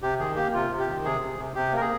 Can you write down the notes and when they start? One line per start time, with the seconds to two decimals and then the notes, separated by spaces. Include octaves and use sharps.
0.02 C3 G4
0.19 D#3 G#4
0.36 A#3 G4
0.54 C3 F4
0.71 C3
0.79 G4
0.88 D#3
1.04 C3 G#4
1.21 C3
1.39 C3
1.55 C3 G4
1.72 A#3 A#4
1.81 G#4